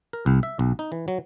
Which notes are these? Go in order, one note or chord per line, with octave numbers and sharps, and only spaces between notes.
A#4
C2
E5
B1
D#4
E3
F#3